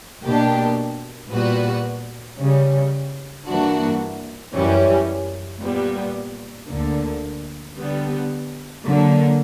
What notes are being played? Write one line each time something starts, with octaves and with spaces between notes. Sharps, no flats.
B2 A#3 D4 G4
A#2 G3 B3 F#4 B4
C#3 G3 C#4
G2 E3 A#3 D4 F#4
F#2 E3 G3 C#4
A#2 G3 B3
D2 D3 A#3
D3 G3 B3
D3 F#3 A#3